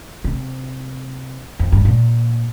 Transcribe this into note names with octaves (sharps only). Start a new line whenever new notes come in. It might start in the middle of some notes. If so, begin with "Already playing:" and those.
C3
F2
G2
A#2